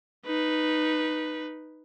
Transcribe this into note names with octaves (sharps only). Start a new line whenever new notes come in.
D#4 B4